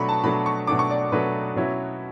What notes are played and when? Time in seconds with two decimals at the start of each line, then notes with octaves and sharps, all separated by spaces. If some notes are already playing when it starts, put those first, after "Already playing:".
Already playing: B2 F#3 A3 D4 B5 C#6
0.09 A5
0.24 B2 F#3 A3 D4 B5
0.46 C#6
0.67 B2 F#3 A3 D4 D6
0.79 C#6
0.90 D5
1.12 B2 F#3 A3 D4 B4
1.56 B2 F#3 C#4 E4